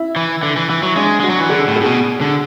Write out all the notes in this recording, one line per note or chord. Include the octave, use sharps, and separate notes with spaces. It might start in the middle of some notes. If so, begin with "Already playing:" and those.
Already playing: E4 E5
E3
D3
E3
E3
F#3
G#3 D4 D5
G#3 F#4
F#3
E3
D3 G#4
A2
G#4
A2
B2
D3